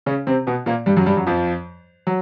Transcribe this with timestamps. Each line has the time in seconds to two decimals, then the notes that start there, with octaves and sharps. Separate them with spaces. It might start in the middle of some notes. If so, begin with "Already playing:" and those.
0.06 C#3 C#4
0.27 C3 C4
0.47 B2 B3
0.66 A#2 A#3
0.86 G2 G3
0.97 F#2 F#3
1.06 G2 G3
1.17 F#2 F#3
1.27 F2 F3
2.07 F#3